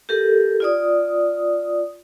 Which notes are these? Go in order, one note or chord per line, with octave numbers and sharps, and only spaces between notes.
G4 A4 A#4
F4 D5 D#6